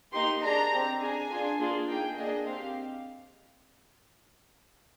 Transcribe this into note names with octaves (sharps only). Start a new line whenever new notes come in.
A#3 D#4 G4 C6
D4 G#4 A#5
C4 G4
D4 G#4 G#5
D4 F4 G#4
A#3 D4 F4 G#4
A#3 D#4 G#4 G5
A#3 D4 G#4 D#5
C4 G4 F5